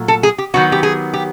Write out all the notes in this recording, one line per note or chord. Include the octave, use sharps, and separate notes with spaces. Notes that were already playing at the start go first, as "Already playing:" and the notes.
Already playing: A#2 F#3 A3
A4
G#4
G4
D#3 F#3 B3 F#4
G4
G#4
G4